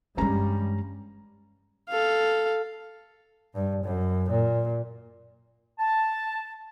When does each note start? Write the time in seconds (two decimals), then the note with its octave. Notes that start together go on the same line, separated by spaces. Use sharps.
0.17 G2 E3 G3 G#3 C#4 A#5
1.90 A4 F5
3.55 G2
3.85 F#2
4.31 A#2
5.79 A5